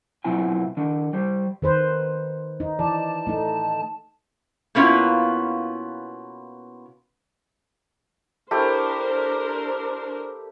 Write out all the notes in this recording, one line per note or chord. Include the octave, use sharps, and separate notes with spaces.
B2 F#3 C4 E4 F4 G#5
D#3 D4
G3 G4 C5
D#3 B4 C5
D#4
E3 D5 A5
A3 D#4
B2 A#3 B3 C#4 E4 F4
A3 D4 E4 G4 A#4 C5